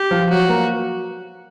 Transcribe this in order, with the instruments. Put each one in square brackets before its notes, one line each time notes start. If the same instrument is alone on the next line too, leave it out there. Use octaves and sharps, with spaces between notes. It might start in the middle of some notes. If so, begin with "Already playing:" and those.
Already playing: [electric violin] G4
[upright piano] F3
[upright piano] F#3 [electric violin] F#4
[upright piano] A#3